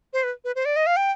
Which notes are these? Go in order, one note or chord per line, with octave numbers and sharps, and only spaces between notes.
C5
B4
B4
C5
D5
D#5
F5
G5